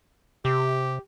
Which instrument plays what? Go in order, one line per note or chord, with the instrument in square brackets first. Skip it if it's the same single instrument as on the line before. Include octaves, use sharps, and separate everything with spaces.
[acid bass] C3 [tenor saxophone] G4